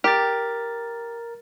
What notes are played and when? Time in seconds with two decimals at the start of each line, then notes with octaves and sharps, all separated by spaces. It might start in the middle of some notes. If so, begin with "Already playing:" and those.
0.04 G4 A#4 A6